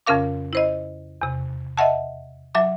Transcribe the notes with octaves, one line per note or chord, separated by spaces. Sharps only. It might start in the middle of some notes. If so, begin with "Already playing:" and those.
F2 C#3 C#4 A#4 F5 D6
E4 C5 D#5
E2 C3
D#5 E5 F#5 A5
F#3 E5 D6